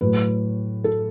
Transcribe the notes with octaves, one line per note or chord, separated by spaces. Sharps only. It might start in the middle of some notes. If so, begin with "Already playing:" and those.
A2 F#3 B4
A4